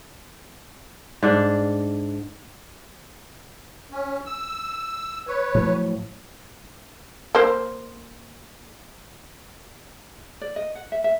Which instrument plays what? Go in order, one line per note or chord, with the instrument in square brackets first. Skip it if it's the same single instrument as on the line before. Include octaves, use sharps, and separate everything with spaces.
[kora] G#2 D4
[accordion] C#4
E6
B4 C#5
[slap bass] A2 F3 F#3
[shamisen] A#3 C5
[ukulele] D5
D#5
F#5
E5
E5